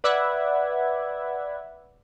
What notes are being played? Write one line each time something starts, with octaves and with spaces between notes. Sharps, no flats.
B4 D5 E5 F#5 B5 G#6